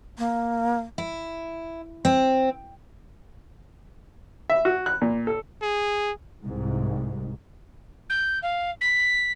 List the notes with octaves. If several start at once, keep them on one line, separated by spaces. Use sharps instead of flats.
A#3
E4
C4
E5
F#4
F#6
A#2
A4
G#4
C2 G#2
G6
F5
B6